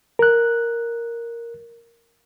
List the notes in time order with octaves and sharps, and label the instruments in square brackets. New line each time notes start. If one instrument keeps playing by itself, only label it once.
[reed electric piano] A#4 F#6